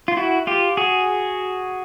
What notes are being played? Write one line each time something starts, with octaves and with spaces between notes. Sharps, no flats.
F4
E4 F#4
F4 G4
F#4 G#4